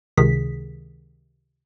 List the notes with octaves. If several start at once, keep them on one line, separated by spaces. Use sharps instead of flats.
C#2 C3 D#3 G#4 B6